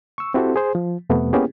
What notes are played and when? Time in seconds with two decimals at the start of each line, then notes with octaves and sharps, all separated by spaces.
0.18 C#6 E6
0.34 C4 E4 F#4 G4 A4 C5
0.56 G#4 C5
0.75 F3
1.10 F2 C3 A3 B3
1.33 A#3 B3 C#4 E4 G4 G#4